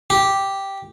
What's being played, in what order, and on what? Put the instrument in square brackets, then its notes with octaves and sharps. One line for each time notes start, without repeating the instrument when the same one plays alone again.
[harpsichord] G4